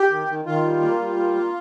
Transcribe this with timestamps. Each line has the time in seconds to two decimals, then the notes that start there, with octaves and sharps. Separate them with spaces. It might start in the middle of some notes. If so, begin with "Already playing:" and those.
Already playing: G4
0.10 D#3
0.27 D#3
0.45 D#3 F4
0.63 G3
0.82 A#3
0.99 G3
1.17 A#3
1.35 A#3